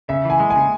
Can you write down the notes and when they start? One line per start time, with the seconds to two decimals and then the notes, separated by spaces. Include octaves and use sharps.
0.09 C#3 E5
0.25 E3 G#5
0.40 G#3
0.50 G#5
0.56 C#3